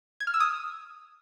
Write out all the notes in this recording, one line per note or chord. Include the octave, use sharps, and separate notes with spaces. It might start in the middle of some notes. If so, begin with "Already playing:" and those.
G#6
F6
E6
D#6